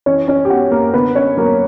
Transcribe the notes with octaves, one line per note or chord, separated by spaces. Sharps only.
E3 C#4 C#5
C#4 C#5
G4
B3 F#4
A#3 A#4
D3 B3 B4
C#4 C#5
F#3 A#3 B3 A#4